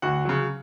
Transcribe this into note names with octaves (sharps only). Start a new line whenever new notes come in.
D2 F#4 F#5
C#3 F#3